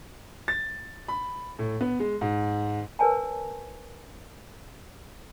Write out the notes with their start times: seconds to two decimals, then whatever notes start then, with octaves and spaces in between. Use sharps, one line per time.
0.48 A6
1.08 B5
1.59 A2
1.81 B3
2.00 G#3
2.21 G#2
2.99 A#4 B4 C#5 G#5 A5